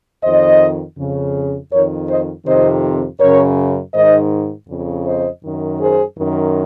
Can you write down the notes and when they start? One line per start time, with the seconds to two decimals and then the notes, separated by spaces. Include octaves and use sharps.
0.23 F2 D#3 C5 D#5
0.98 F2 C#3
1.71 F2 D#3 A#4 C#5
2.09 C5 D#5
2.46 F2 C3 D#3 C5 D#5
3.20 F#2 C#3 A#4 C#5
3.94 G#2 D#3 C5 D#5
4.68 F2 C#3
5.05 C5 D#5
5.42 F#2 D#3
5.79 G#4 C5
6.16 F#2 D#3